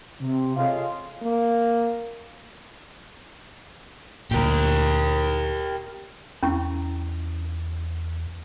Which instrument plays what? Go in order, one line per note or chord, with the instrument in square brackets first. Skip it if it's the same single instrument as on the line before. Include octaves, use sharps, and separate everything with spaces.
[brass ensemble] C3
F4 G#4 A4 C#5 D#5 F5
[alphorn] A#3
[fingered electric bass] D2 A#2 [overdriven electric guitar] G4 A#4
[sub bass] E2 [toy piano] C#4 E4 C#6